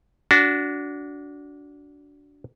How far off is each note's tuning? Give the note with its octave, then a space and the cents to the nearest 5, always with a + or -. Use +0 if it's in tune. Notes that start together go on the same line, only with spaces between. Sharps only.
D4 -20 F#4 +0